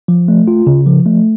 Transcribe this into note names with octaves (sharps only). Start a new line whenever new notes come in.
F3
A3
F4
C#3
F3
A3